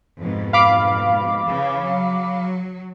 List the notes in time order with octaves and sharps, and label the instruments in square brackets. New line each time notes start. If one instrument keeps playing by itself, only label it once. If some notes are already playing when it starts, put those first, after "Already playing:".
[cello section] F2 G#2 B2
[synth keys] F5 B5 D6
[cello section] C#3 E3
F#3